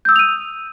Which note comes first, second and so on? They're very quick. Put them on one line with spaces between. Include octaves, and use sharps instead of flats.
G6 E6 D#6 F7 D#7